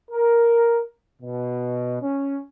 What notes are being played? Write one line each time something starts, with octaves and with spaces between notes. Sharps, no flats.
A#4
B2
C#4